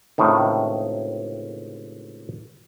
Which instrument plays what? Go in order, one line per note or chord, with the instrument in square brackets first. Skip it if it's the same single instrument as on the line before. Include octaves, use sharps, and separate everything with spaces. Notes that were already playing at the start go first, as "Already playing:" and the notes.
[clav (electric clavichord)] C#2 A2 C3 D#3